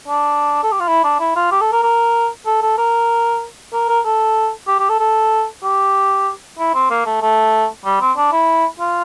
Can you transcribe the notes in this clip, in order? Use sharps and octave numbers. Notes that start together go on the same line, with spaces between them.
D4
A4
G4
F4
E4
D4
E4
F4
G4
A4
A#4
A#4
A4
A4
A#4
A#4
A#4
A4
G4
G4
A4
A4
G4
E4
C4
A#3
A3
A3
G3
C4
D4
E4
F4